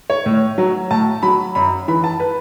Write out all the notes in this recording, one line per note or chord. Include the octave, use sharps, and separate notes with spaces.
C#5
A2
F#3
A2 A5
F#3 B5
F#2 B5
E3 B5
A5
B4